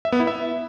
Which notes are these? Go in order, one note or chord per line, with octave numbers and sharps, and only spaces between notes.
E5
B3
E4
E5